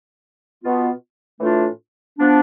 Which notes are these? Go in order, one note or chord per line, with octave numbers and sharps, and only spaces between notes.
B2 B3 F4
A2 E3 A3 D4 F4
F3 B3 D4